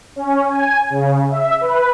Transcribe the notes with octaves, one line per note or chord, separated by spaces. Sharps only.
C#4
G#5
C#3
E5
B4